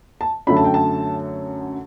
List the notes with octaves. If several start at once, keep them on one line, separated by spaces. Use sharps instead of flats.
A5
F#2 D3 F#3 A3 B5
A5
G5
A5